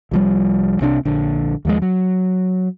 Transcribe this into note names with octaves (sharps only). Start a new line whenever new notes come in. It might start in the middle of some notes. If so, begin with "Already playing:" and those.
C2 F3 G3
C2 C3 D4
A#1 D3
D#2 F3 G#3
F#3